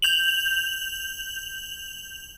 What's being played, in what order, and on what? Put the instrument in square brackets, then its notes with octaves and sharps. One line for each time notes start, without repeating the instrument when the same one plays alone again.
[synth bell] G6 F7 F#7